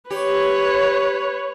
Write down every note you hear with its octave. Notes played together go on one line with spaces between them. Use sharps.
G4 B4 C#5